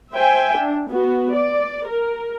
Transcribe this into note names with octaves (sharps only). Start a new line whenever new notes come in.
C5 E5 G5 G#5
D4
B3 F#4
D5
A#4